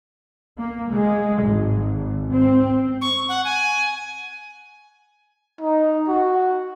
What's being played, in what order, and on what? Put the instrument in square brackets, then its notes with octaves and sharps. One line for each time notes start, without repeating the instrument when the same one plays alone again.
[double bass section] A#3
G#3
G#1
C4
[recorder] C#6
F#5
G#5
[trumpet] D#4
F#4